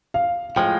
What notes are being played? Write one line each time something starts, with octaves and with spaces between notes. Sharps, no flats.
F5
A2 F3 G#3 G5